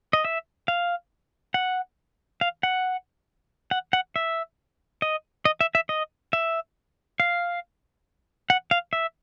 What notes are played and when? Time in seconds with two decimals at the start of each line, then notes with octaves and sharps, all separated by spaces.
0.13 D#5
0.25 E5
0.68 F5
1.54 F#5
2.41 F5
2.63 F#5
3.71 F#5
3.93 F#5
4.16 E5
5.02 D#5
5.45 D#5
5.61 E5
5.75 E5
5.89 D#5
6.33 E5
7.20 F5
8.50 F#5
8.71 F5
8.93 E5